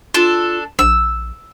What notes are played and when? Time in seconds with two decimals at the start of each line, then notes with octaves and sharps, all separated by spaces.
0.14 D4 F4 A4
0.79 A#1 E6